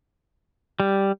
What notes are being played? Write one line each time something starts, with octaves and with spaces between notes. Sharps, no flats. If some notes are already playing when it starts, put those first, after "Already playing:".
G3